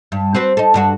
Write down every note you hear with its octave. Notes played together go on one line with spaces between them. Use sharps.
G2
C4 F#4 B4
D#4 A4
G2 D4 F#4